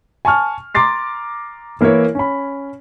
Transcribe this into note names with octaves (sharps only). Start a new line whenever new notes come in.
G#5 A5 C#6 F6
A#5 C6 D6 A6 C7
E3 A#3 E4 A#4 C#5
C#4 B5